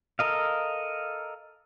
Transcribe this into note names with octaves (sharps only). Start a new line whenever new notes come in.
A4 A#4 D#5 F5